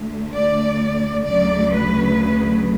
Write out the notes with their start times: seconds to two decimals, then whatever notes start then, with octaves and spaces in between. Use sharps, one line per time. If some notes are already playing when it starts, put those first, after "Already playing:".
Already playing: D2 D3 A3
0.33 D5
1.25 D2 C#3 F#3 D5
1.71 B4